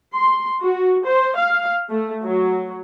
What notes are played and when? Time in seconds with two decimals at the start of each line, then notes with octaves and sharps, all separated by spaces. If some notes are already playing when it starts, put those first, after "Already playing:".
0.14 C6
0.61 F#4
1.06 C5
1.36 F5
1.89 A3
2.23 F#3